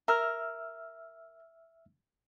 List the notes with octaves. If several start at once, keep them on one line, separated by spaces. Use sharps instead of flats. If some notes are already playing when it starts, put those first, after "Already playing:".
A#4 E5 E6 F6